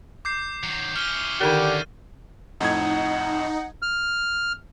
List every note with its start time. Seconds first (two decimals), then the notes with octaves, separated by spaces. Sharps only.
0.25 D6 G6 C7
0.63 D#3 F#3
0.96 C#4 E4 F6 G7
1.41 D3 D#3 D4 D#4 G4 A#4 A6 D#7
2.61 F2 A2 D#4 F#5 G#6
3.82 F6